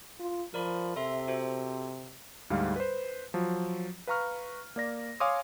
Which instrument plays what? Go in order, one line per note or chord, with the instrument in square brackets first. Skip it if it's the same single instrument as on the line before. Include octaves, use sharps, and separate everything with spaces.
[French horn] F4
[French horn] F3 [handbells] A#4 D5 B5
[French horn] C3 [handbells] A4 E5 C6
[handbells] F#4 A4 C5
[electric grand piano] D2 G#2 G3 F5
B4 C5
F3 F#3
B4 F5 A#5 C#6 F6
A#3 D5 A#6
C#5 F5 G#5 C6 D6 D#6